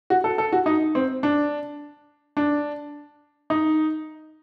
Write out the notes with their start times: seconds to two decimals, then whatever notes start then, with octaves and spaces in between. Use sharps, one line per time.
0.10 F#4
0.24 A4
0.38 A4
0.52 F#4
0.66 D#4
0.95 C4
1.23 D4
2.37 D4
3.50 D#4